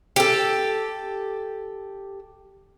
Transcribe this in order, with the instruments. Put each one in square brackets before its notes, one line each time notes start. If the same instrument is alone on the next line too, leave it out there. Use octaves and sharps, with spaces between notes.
[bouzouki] G4 A4